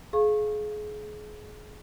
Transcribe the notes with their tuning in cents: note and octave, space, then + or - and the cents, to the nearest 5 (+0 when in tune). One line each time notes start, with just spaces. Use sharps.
G#4 +30 F5 +0 C#6 -25